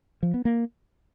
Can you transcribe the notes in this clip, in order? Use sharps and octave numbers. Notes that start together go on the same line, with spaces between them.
F3
B3
A#3